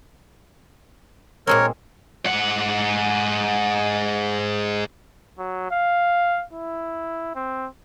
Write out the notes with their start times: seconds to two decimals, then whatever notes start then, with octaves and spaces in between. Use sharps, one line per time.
1.47 A#2 G#3 C4 A#4 C#5
2.25 G#2 F#5
5.39 F#3
5.71 F5
6.53 E4
7.35 C4